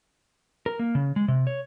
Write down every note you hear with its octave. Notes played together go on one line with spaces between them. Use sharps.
A#4
A#3
C#3
G#3
C3
C#5